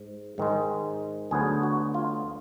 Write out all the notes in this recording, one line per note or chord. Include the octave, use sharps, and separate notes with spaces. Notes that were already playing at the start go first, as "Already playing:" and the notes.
Already playing: G#2
G#2 D#3 G#3
D2 D3 F#3 B3 G#4
F#4
F4